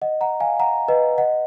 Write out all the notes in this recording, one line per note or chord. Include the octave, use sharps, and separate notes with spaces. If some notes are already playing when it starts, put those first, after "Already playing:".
D#5 F#5
F#5 A#5
F5 G#5
F#5 A#5
B4 D#5
D#5 F#5